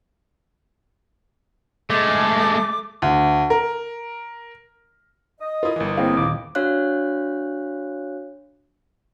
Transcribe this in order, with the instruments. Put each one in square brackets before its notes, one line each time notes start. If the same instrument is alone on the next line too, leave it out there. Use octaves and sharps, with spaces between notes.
[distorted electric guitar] G#3 A4 [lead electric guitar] A3 [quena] D6
[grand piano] D2
A#4
[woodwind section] D#5
[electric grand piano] E4 F4 [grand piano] A#4 D#6
[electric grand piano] G1 E3
[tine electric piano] A#3 C4 G#4 [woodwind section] E4 D#5 [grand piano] F5
[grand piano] D#1 [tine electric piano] D6
[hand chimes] D4 F#4 C#5 F5 F#6